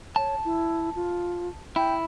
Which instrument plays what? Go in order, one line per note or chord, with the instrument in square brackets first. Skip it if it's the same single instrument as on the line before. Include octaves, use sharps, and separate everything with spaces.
[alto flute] C#5 [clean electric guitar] A5
[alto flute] E4
F4
[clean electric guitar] E4 [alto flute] G5